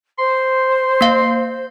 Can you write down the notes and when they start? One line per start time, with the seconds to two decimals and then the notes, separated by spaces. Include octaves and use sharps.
0.19 C5 C6
1.01 A#3 F5